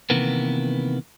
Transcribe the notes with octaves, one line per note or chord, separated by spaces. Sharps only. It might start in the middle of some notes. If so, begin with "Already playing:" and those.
C3 D#3 E3 A#3 B3